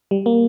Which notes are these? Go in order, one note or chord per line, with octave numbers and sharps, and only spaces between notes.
G3
A#3